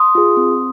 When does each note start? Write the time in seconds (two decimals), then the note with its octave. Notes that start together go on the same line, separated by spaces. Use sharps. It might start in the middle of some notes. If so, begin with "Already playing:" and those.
Already playing: C6 D#6
0.15 F4 G#4
0.37 C4